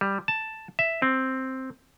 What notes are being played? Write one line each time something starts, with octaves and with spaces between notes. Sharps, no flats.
G3
A5
E5
C4